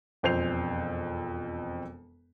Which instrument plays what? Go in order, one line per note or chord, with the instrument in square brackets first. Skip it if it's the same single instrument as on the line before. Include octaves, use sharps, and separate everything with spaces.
[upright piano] E1 F2 C5 G6 C7 F7